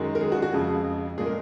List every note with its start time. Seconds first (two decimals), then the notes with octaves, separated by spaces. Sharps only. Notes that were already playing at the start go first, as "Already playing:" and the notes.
Already playing: F#2 D#3 G#3 F#4
0.15 A#4
0.21 G#4
0.32 F#4
0.42 F#4
0.53 F2 C#3 F3 G#3 G#4
1.18 A#2 G#3 G#4
1.26 A#4